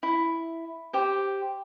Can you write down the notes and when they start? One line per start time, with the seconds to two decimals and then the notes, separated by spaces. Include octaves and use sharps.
0.03 E4
0.93 G4 C5